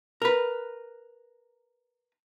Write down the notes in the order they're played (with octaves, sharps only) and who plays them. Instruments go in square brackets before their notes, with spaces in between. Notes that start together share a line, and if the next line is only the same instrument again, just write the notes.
[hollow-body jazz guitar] A#4 B4